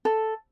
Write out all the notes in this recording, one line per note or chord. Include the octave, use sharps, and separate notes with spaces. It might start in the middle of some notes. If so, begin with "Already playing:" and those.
A4